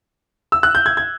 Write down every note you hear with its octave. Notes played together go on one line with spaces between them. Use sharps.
E6
F#6
G6
G#6
G#6